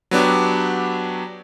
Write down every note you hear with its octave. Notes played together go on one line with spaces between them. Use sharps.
F#3 B3 D4 G4